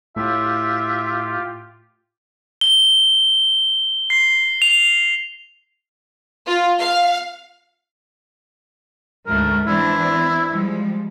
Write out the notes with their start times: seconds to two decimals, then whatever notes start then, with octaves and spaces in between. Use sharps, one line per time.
0.16 A2 F4 G4 E5
2.61 G7
4.10 C7
4.62 F7
6.47 F4
6.79 F5
9.27 D2 G#2 A3 A#4
9.67 E3 C4 D4 E4
10.52 F3 G3 G#3